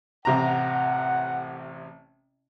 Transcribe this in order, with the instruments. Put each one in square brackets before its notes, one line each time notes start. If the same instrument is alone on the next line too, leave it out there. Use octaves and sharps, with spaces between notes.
[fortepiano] A1 C3 A#5 [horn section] F#5